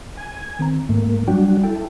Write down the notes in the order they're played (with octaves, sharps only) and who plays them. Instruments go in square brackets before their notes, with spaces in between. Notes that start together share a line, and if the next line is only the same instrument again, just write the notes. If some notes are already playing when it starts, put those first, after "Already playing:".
[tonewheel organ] G#5
[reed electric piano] D#3 C4 A#5
[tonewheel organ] G#2 A#3 [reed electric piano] A3
[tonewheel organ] F#3 D4 F#4 [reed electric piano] G3 G5
[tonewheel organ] E4 A4 [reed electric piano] G5